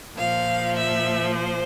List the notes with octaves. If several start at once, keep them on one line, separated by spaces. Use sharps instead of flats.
A#2 F3 F5
E5
C5